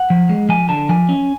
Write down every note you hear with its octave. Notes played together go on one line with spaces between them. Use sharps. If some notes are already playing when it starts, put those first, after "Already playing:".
Already playing: F#5
F3
G#3
F3 G#5
D3 A5
F3 G#5
C#4